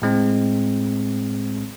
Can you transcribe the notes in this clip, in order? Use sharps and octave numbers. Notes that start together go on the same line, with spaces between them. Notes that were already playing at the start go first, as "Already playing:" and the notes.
A2 G#3 C4